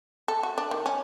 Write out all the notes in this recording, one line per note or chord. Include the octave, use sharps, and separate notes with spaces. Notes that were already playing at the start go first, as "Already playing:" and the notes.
A4
F#4
D4
D#3
C#4